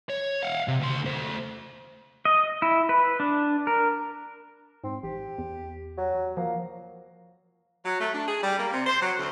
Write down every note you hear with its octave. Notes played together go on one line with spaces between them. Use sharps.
C#5
F5 F#5
C3
D2 C6
A3 C5
D#5
E4
B4
D4
A#4
G#2 C4
A1 G4
E2
F#3
F3 A#3
F#3
A3
D4
G#4
G3
A#3
C3
C5
F#3
D2